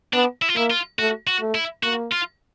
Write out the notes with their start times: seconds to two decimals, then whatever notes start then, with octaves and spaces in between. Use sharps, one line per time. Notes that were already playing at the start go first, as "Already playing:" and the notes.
0.13 B3 D4
0.42 E4
0.49 F4
0.57 A#3 E4
0.71 F4
0.99 A3 F#4
1.27 F#4
1.41 A3
1.55 E4
1.83 A#3 F#4
2.11 F4